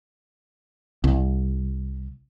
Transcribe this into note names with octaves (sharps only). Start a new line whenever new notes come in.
C2